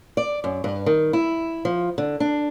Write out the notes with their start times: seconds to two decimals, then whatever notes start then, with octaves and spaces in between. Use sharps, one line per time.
0.17 D5
0.44 F#2
0.64 G2
0.86 D#3
1.13 E4
1.65 F3
1.98 D3
2.20 D4